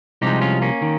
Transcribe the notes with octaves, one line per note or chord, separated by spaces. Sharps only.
C2 C3 F3 G#3 D#4 G4
C#4 F4
A#3 C#4
D#3